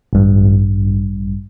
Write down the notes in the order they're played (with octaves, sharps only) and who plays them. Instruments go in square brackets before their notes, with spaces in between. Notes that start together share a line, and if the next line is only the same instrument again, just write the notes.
[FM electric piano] A1 G2